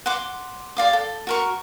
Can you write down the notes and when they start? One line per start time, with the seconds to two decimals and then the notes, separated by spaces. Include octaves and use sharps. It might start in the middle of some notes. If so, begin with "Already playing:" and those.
0.06 F#5 C6 D6
0.77 G4 D5 F5 D6
0.93 A4
1.27 F#4 A#4 C#6